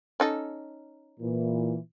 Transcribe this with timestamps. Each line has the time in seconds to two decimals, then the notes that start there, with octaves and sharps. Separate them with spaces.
0.20 C#4 D#4 A4
1.20 A#2 E3